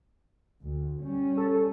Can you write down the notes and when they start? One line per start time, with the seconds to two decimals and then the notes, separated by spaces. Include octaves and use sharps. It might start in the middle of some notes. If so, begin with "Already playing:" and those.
0.62 D2
1.02 G3 C#4
1.37 A4